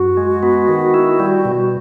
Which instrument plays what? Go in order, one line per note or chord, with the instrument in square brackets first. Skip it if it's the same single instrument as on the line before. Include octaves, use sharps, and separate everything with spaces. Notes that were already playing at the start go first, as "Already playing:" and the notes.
Already playing: [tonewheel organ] F#2 [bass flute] F#4
[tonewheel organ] G#3
B3
D#3
E4
G3
B2